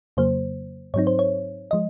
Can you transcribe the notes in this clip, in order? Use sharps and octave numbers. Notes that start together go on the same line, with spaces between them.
F2 C#3 F#3 A#3 C5
G#2 F#3 C4 D#4 C#5
C5
C#5
F3 G#3 D#5